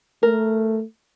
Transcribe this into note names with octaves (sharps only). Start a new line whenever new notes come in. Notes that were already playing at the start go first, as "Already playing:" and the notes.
A3 A#4